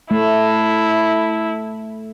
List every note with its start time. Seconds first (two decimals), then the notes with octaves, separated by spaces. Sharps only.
0.11 A3 E4